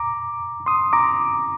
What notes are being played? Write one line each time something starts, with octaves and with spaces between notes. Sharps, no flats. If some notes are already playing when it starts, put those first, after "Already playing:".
Already playing: A#5 D6
C6 D#6
A#5 D6